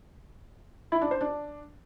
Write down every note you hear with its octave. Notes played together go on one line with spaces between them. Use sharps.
E4
D4
C5
D4